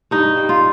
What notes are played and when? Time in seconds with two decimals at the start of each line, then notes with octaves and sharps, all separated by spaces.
0.11 G2 D#4
0.37 G3
0.49 F4